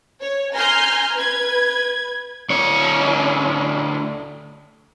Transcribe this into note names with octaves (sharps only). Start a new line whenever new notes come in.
C#5
G#5 A#5 C6 F6 G6
B4 G#6
D2 C#5